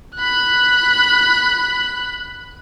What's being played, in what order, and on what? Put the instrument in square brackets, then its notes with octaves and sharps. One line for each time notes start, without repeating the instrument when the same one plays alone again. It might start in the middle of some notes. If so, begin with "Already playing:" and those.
[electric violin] B5 F#6